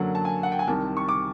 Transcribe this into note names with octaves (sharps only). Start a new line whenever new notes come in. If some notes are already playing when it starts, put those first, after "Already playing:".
Already playing: F#2 D3 F#3 A#3 F#5
A5
G#5
F#5
G5
G#5
C2 C3 D#3 A5
C#6
D6